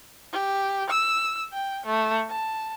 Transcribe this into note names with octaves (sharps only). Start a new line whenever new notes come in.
G4
E6
G5
A3
A5